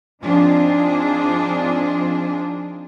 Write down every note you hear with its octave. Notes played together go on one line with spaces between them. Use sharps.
F3 C4 D4 D#4 F4 G#4